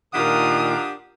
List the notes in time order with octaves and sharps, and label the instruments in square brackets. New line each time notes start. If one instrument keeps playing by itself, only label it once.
[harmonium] A#2 D#3 [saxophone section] D4 G4 F#5 [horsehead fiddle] F4 A#4 [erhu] D#6